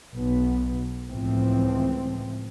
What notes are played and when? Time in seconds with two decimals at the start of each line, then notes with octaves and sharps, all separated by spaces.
0.14 B1 B3
1.10 C#2 A2 E3 F3 C4